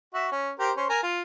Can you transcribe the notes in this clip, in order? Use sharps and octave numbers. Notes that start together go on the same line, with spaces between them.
F#4 E5
C#4
G4 A#4 C5
C#4 C5
A#4 G#5
F4